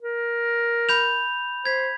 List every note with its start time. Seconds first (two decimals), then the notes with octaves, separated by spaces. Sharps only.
0.02 A#4
0.89 B5 G6 F7
1.65 C5 G#6 B6